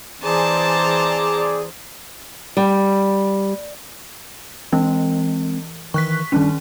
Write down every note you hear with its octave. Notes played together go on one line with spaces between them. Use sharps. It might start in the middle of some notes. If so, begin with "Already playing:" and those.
E3 C4 G#4 C5 D5 A5 A#5
G3
E3 G#3 C4
D#3 E3 C#6 F#6 B6
G1 D#3 G3 C#4 D4